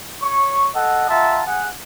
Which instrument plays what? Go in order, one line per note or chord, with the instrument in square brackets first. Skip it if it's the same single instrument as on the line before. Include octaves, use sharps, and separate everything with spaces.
[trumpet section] C#5 C#6
A4 D#5 F#5
F4 E5 F#5 A5 A#5
G#4 F#5